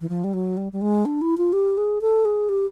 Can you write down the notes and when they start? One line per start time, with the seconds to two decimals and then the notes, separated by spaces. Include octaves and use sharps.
0.01 E3
0.09 F3
0.24 G3
0.33 F#3
0.57 G3
0.72 G3
0.81 G#3
1.05 D4
1.21 E4
1.37 F4
1.53 G4
1.77 G#4
2.01 A4
2.25 G#4
2.49 G4